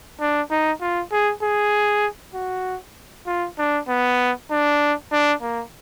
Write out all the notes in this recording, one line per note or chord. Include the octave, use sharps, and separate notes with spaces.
D4
D#4
F4
G#4
G#4
F#4
F4
D4
B3
D4
D4
A#3